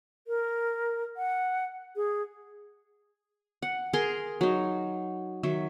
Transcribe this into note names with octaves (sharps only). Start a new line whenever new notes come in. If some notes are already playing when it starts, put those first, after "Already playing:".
A#4
F#5
G#4
F#5
G#4 A#4 C6
F#3 D#4
D#3 F#3 E5